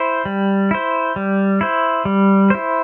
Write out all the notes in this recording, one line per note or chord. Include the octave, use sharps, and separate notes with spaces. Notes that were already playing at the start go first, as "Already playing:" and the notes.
Already playing: E4 C5
G3
E4 C5
G3
E4 C5
G3
E4 C5